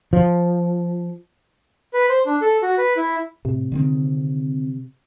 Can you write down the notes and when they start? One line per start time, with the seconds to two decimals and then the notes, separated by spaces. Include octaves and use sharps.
0.13 F3
1.93 B4
2.09 C5
2.26 D4
2.42 A4
2.62 F#4
2.78 B4
2.97 E4
3.45 A2 C3
3.72 D3 D#3 C4